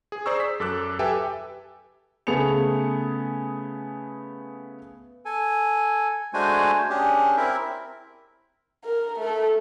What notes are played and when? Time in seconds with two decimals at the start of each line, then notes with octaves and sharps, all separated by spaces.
0.12 G#4
0.26 G#4 C5 D5 A#5 C#6 E6
0.40 B6
0.60 F#2 A4 D6 F#6
0.99 G4 A4 B4 E5 G5 G#5
2.27 C#3 A3 B3 G#4 C#7 F7
5.25 A4 G#5
6.34 G#3 A3 D4 F#4 C5 G#5
6.90 C#4 D4 G4 G#4
7.37 C4 E4 A#4 E5
8.85 A#4
9.19 A3 A4